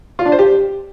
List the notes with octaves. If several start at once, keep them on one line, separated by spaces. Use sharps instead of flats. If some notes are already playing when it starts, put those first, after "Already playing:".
F4
D4
C5
G4